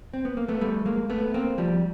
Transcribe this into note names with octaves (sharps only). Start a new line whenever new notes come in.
C4
B3
A#3
A3 B3
G3 A3
G#3 A#3
A3 B3
A#3 C4
F3 G3